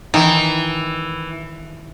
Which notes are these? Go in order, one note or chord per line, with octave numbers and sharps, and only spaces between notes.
D#3 E3